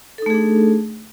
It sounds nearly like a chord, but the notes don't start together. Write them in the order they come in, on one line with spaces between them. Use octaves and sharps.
A4 D#4 A3 G#4 D4